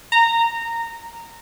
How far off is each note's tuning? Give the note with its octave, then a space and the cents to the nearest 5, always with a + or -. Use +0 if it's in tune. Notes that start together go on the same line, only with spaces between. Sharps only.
A#5 -15